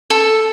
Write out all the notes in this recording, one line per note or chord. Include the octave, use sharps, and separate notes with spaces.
A4